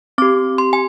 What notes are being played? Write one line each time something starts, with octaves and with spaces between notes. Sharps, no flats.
C4 G4 D6
C6
G#5